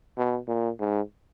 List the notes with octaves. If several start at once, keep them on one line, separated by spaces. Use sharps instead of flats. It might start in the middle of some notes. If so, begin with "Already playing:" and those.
B2
A#2
G#2